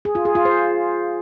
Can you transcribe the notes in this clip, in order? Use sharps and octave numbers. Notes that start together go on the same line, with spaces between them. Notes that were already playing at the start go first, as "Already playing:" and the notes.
G#4
F4
G#4
F4
C5